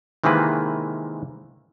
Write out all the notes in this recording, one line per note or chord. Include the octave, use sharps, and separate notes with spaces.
C3 D#3 E3 G#3 A#3 B4